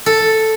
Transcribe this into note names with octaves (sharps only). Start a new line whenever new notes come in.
A4